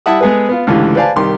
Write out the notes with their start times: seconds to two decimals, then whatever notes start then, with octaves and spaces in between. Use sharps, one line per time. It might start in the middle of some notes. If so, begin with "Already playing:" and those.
0.06 G3 E4 E5 F#5 A5 D#6
0.21 G#3 B3 G#4 A4 B4
0.49 B3 F4
0.67 C#2 A2 D3 E3 F4 G4
0.95 B4 C5 D5 F5 G#5 A5
1.16 C2 D#3 G4 C6